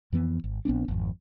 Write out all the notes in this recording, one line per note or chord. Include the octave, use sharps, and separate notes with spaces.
F2 E3 B3
G#1
A#1 B3 C4 D4
G#1 F2